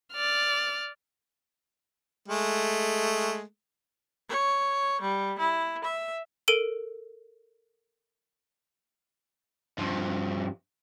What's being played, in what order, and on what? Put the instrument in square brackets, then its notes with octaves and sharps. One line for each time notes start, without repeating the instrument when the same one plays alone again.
[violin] D5 F6
[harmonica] G#3 A3
[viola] C#5
G3
E4
E5
[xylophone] A4 A#4 D7 D#7
[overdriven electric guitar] G2 F3